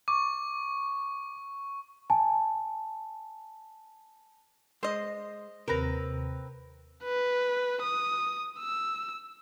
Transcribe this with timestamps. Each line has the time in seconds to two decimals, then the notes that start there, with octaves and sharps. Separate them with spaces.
0.08 C#6 D6
2.10 G#5 A5
4.83 G#3 C5 D#5
5.68 D#2 C3 C4 A#4 B4 A#5
7.04 B4
7.82 D#6
8.59 E6